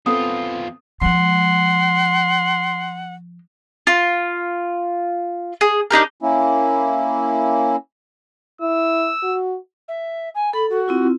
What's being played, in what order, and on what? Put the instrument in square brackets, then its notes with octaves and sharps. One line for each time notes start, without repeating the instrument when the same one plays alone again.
[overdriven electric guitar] E2 F4 [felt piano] B3 C4 A4 [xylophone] D#6
[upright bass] F3 G#3 [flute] F#5 [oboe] C6
[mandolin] F4
G#4
D4 D#4 G4 A#4
[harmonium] A#3 C#4 E4
[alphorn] E4 [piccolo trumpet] E6
[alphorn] F#4
[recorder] E5
G#5
[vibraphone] A4 [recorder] B5
[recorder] F#4
[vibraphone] C4 E4 F4